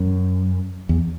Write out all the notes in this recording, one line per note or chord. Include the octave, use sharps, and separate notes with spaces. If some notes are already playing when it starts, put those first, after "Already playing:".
Already playing: F#2
E2